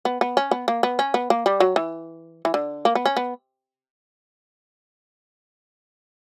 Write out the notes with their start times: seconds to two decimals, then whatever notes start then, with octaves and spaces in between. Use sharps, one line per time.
0.05 B3
0.21 B3
0.37 C#4
0.51 B3
0.68 A#3
0.83 B3
0.99 C#4
1.14 B3
1.30 A#3
1.46 G3
1.60 F#3
1.76 E3
2.45 E3
2.54 D3
2.85 A#3
2.95 B3
3.06 C#4
3.16 B3